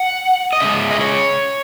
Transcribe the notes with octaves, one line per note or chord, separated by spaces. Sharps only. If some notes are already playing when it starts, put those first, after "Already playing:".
Already playing: F#5
D#5
C#3 G#3 E5
D#5
C#5